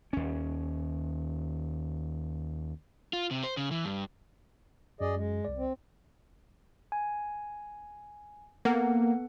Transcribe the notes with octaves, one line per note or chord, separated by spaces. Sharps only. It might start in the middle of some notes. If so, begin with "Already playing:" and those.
D#2 C#4
F4
C3
C5
C#3
E3
G2
F#2 G#4 D5 D#5
G#3
C2 D5
C4
G#5
A#3 B3 A4 F#5